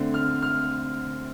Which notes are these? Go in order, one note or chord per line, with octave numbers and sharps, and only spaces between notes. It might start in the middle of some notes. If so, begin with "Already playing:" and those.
Already playing: D3 A3 C4
F6
F6